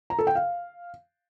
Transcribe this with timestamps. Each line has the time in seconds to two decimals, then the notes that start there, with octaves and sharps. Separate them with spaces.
0.10 A#5
0.19 A4
0.27 G5
0.35 F5